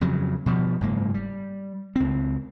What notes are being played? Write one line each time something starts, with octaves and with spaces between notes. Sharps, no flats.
F2 C#3 F#3
B2 F3 G3
F#1 G#2 A#3
G3
C#2 C4